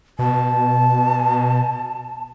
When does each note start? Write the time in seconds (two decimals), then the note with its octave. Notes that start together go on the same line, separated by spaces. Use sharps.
0.19 B2 A5